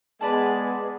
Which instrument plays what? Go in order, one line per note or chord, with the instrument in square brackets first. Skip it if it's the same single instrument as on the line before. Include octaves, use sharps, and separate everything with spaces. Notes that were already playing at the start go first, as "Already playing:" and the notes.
[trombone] G#3 [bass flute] B3 [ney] G#4 [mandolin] B4 D5 A5